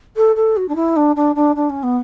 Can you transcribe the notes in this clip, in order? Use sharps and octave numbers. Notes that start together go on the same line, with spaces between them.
A4
A4
F#4
D4
E4
D4
D4
D4
D4
C#4
B3